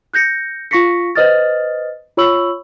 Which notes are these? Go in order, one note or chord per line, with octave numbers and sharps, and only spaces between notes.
F#6 G6 A#6 C#7
F4 F5 C#6 A#6 B6 C#7
B4 C5 D#5 D#6 F6 A6
F4 C#5 B5 C#6 E6 F#7